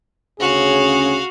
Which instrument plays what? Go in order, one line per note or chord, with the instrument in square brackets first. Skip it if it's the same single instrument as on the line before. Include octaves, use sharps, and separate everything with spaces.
[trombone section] D2 C#3 C#4 [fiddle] F#4 F5 [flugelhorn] G#4